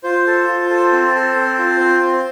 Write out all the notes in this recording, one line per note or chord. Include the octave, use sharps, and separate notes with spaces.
F4 C5
A4
F4
A4
C4
A4
C4
F4
C4
C4